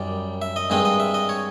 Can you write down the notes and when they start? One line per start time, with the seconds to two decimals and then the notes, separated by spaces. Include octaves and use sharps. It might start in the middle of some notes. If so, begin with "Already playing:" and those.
Already playing: F#2 D#3 G3 D5
0.42 E5
0.56 D#5
0.70 G2 D#3 G#3 C4 D#5
0.85 D#5
1.00 E5
1.14 D#5
1.29 C#5